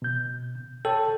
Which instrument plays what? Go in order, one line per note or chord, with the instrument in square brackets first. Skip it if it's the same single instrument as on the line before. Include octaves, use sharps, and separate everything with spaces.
[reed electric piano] B2 G6
[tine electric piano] A4 [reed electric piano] C#5 G5 A5